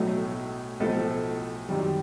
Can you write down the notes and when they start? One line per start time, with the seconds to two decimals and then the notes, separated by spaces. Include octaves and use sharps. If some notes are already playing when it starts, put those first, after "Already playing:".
Already playing: B1 A2 F#3 A3
0.80 B1 A2 F3 A3 A4
1.69 F#2 D#3 G3